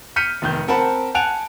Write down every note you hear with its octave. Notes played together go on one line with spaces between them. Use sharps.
F6 G6 B6 C#7 D#7
F1 D#3 G6
C4 A#4 F#5 A5 B5
F#5 G#5 A5 F#6 D7 F7